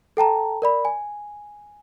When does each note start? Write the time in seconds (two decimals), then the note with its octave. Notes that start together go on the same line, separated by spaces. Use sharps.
0.17 A4 G5 A5 A#5
0.62 A#4 D5 B5
0.85 G#5